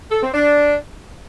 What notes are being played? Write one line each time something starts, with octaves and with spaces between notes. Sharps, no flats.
A4
C4
D4